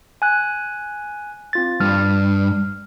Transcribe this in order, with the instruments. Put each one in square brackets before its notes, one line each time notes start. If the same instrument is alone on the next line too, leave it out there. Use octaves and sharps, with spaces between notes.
[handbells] G#5 F#6
C4 F4 A6
[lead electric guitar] G2 [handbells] F6